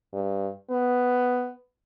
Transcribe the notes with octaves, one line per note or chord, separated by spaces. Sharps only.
G2
B3